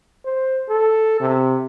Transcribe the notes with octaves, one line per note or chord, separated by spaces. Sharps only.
C5
A4
C3